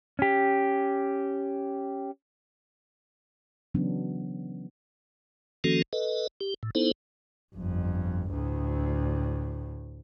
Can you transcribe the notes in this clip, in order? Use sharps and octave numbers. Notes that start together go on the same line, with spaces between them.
C#4 G4
C#3 E3 F#3 B3 C#4 D4
D#3 F3 A#3 C#4 F#4 A4
A4 B4 D#5
G4
A2
B3 D#4 E4 A4 C5
G1 F2
D2 A2